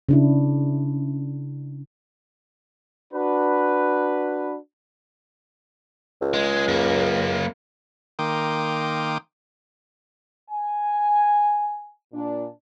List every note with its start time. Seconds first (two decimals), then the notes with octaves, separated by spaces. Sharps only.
0.09 C#3 D4 E4
3.13 D4 F#4 B4
6.22 C#2
6.34 G#3
6.68 F#2 A#3
8.19 D#3 A#3 G5 C6 D6 D#6
10.50 G#5
12.13 A#2 D4